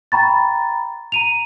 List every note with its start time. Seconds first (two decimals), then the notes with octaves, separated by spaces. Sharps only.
0.12 G5 A#5 B5 C#6 A6
1.12 A#5 D#7 F7